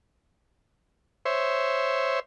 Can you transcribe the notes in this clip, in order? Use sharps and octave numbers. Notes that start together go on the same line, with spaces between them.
C5 C#5 E5